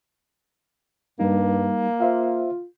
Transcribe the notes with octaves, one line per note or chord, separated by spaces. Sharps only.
G2 G3 A#3 D#4
F4 C5 E5 F5